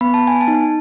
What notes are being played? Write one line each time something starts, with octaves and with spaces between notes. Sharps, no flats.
B3 B5
A5
G#5
A5
D#4